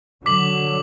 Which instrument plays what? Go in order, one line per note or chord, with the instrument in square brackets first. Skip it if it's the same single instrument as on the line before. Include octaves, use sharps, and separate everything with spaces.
[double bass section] D3 F#3 [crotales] D6 B6 F#7